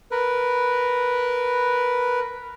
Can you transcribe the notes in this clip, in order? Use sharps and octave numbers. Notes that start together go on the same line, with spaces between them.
A#4 B4